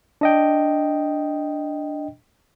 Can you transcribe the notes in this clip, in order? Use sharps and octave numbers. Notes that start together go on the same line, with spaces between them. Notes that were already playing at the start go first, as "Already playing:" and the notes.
D4 D#5 G5